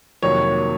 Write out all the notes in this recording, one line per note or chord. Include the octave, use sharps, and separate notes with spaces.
F2 C3 D#3 F#3 A#3 C#5